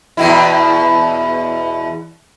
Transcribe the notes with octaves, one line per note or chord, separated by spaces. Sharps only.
E2 B2 E4